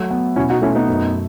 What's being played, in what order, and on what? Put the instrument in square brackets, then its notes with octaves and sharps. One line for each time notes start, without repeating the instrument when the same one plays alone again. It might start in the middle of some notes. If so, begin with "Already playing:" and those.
Already playing: [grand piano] F#3 A3
B3
[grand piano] B2 [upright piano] C#4 E4
[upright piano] D#4 F#4
[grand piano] A3 [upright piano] C#4 E4
[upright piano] B3 D#4
[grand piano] F#2